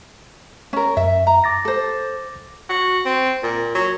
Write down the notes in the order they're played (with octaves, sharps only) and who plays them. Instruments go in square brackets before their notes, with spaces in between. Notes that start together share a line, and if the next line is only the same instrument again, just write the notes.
[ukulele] C#4 A#4
[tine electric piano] F#2 [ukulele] E5
[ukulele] A#5
[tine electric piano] D6 A6 A#6
[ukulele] A4 C5
[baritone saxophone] F#4
C4
A#2
F#3